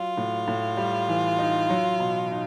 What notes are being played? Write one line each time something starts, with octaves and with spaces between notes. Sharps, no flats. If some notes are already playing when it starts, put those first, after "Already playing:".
Already playing: F#3 F4
A2
A2
G3
E3
D#4
F#3
B2
D#4